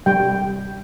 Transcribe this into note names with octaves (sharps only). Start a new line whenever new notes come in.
G3 G5